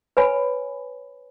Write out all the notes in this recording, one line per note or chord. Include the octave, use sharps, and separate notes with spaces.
B4 C#5 G#5 B5